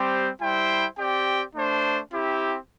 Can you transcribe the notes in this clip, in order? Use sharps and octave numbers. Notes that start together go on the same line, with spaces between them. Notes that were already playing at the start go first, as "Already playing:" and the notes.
Already playing: G3 C4 G4 C5
G3 E4 C5 G5
C4 G4 D5 G5
A3 D4 C5
C4 E4 G4